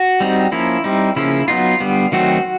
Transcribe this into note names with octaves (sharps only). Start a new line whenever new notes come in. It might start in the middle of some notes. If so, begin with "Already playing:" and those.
Already playing: F#4
G3 C4 D#4
F3 A#3 C#4 E4
G3 C4 D#4
C#3 F3 A#3 C#4 E4
F#3 B3 D#4 F4
D3 G3 B3
D#3 F#3 A3 C4 F#4